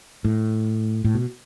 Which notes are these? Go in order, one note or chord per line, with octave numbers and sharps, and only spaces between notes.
A2
A2
B2